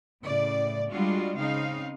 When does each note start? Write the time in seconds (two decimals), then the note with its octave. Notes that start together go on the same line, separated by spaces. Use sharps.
0.22 A2 C#3 D5
0.89 G3 G#3 D4 F4 F#4
1.35 C#3 C4 D#4 F5